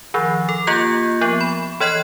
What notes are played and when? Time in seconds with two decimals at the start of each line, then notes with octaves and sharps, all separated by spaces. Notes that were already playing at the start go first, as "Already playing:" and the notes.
0.14 D#3 F3
0.49 A4
0.67 A#3 F4 G4 G6
1.21 F3 B3
1.41 B5
1.80 E3 C#5 D#5 F#6 C7